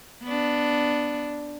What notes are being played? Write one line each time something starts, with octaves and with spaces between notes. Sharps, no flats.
B3 D4